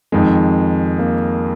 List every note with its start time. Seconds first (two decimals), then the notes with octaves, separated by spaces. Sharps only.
0.12 F2 D#3 G#3
0.99 A#3